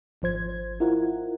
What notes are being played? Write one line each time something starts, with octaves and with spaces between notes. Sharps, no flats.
G#1 F3 C5 G#6
E4 F4 A#4 F#5